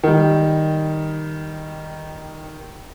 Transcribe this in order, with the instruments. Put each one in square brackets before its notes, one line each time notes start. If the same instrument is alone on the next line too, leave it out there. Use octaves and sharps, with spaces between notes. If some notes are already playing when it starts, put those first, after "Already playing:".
[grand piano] D#3 G3